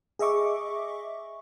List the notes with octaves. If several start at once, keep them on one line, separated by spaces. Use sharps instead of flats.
G#4 D#5 E5 C#6 D6